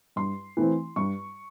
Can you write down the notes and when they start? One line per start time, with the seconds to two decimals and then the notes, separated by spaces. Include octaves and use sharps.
0.16 G2 C6
0.57 E3 A3 C4
0.96 G2 C#6